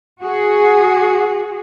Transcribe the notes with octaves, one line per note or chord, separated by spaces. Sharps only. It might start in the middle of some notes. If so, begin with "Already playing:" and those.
F#4 G#4